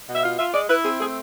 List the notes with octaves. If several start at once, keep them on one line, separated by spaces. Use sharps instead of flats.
B2
E5
F4 F5
F4 E5
G#3 D5
E4 B4
C4 G#4
A3 G#4